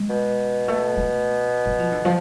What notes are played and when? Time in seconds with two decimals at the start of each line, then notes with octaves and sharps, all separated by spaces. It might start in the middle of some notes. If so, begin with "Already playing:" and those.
Already playing: G#3
0.09 B2
0.68 A3
0.97 A3
1.66 F#3
1.79 F3
1.92 D3
2.05 F3